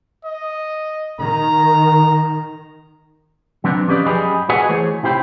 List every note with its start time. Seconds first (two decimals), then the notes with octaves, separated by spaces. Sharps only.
0.24 D#5
1.20 D#3 A#5
3.64 F#3 B3 C4 D4
3.88 F3 C#4 G4 B4 D5 D#5
4.06 F#2 G3 G4 G#4 D#5 B5
4.49 F#4 G#4 B4 D#5 F#5 G#5
4.69 E3 A3 G#4 C5 C#5
5.03 C3 E4 G4 C5 G5 B5